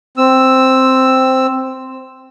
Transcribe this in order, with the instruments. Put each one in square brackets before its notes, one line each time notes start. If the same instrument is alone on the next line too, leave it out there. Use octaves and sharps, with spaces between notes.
[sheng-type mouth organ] C4 E6